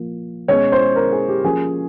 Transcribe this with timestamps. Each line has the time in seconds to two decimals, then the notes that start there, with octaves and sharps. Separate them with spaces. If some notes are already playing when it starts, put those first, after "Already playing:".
Already playing: A#2 F3 A#3
0.48 B2 G#3 C#4 C#5
0.72 C5
0.96 A#4
1.12 G#4
1.28 G4
1.44 F3 A#3 C#4 G#4